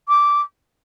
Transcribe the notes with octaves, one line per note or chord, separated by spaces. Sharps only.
D6